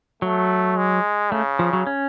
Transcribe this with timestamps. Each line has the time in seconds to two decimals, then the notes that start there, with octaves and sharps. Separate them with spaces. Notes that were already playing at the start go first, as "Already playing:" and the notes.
0.22 F#3 A3
0.77 G#3
1.32 C#3 A3
1.59 F3
1.73 F#3
1.87 C#4